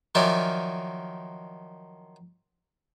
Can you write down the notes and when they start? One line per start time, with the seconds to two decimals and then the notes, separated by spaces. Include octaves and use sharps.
0.15 D#3 F3 F#3 D5 E5 G#5